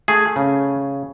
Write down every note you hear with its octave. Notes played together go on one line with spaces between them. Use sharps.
A3 G#4
C#3